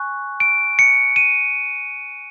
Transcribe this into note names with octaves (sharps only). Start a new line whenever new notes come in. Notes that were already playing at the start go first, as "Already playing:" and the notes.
Already playing: G#5 C#6 F#6
D7
C#7
D#7